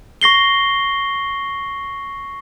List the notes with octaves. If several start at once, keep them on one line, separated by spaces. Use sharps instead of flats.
C#6 A#6 C7 G7